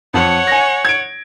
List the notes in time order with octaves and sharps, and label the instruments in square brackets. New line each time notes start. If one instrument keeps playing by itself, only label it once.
[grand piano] F2 [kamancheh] C#5 F#5
[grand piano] G#5 A#6
G#6 D7